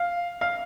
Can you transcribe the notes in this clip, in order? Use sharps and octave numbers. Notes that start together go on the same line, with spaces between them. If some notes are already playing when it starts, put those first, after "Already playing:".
Already playing: F5
F5